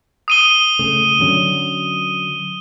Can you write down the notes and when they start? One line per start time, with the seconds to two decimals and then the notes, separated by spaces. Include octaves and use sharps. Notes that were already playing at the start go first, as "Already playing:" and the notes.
0.28 D#6 D#7 G7
0.79 C#3 A3
1.20 D3 F#3 C#4